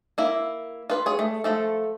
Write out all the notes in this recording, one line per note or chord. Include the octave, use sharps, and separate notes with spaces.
A#3 E4
F4 B4
G#4 C#5
A3
F3 A3 A4